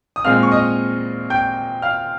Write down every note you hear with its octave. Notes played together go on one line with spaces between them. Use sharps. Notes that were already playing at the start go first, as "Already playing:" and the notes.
D#6
A#2 G#3 C4 F5 F6
C#6
D#5 D#6
G5 G6
F5 F6